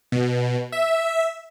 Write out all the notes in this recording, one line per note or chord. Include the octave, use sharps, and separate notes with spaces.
B2
E5